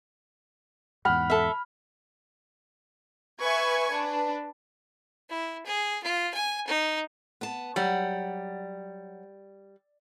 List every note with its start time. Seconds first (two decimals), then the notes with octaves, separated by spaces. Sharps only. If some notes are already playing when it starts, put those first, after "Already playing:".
1.05 E2 G#2 F#5 B5 F6
1.30 A4 E5
3.42 B4 E5 G#5 C#6 G#6
3.90 D4 B4
5.30 E4
5.65 G#4
6.03 F4
6.34 G#5
6.67 D#4
7.41 B3 A5
7.76 F#3 G3 F#5